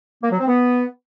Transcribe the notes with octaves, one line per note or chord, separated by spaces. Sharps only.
A#3
F#3
C4
B3